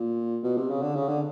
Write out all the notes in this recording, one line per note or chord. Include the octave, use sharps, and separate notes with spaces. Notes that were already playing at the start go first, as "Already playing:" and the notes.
Already playing: A#2
B2
C3
C#3
D3
C#3
D3